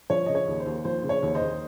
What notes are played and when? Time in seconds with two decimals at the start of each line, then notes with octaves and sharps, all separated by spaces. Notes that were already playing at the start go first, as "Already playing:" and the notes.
0.10 F3 C#5
0.26 C#3 D#5
0.35 C#5
0.48 D#2
0.60 C5
0.66 D#2
0.85 F3 C5
1.03 C#3
1.09 C#5
1.23 D#2
1.35 C5 D#5
1.41 D#2